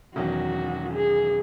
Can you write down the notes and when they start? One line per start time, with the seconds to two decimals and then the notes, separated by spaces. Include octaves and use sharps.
0.16 E1 E2 D#3 F#3 C#4 F#4
0.94 G#4